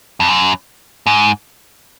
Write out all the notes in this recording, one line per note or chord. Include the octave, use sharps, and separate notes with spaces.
F2
F#2
G#2